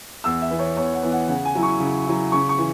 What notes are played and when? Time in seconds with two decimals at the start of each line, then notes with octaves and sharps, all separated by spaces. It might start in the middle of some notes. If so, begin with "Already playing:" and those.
0.24 E2 E6
0.42 E5
0.51 E3 B3
0.59 C#5
0.77 E2 C#5
0.93 F#5
1.02 E3 B3
1.12 F#5
1.28 C#3 F#5
1.45 G#5
1.55 F#3 E4
1.63 C#6
1.80 C#3
2.07 F#3 E4
2.32 C#3 C#6
2.49 C#6
2.58 E3